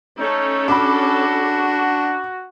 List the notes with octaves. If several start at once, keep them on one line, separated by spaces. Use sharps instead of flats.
A3 C#4 D#4 A4 C#5
D4 F#4 B5 D6